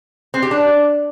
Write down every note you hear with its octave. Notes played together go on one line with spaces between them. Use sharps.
C4
G4
D4